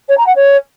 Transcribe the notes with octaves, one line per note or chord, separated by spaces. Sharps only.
C#5
A#5
F#5
C#5